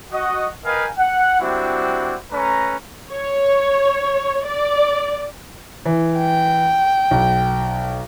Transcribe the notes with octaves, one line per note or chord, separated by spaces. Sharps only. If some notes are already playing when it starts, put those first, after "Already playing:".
F#4 D#5 F#5
A#4 B4 D#5 F5 G5 G#5
F#5
G3 C4 D4 E4 F#4
A3 C#4 B4 A#5
C#5
D5
E3
G5
B1